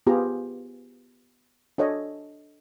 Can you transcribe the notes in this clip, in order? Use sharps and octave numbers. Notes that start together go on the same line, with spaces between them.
B3 F4 G4 G#4 A#5
D4 A4 C#5 D#5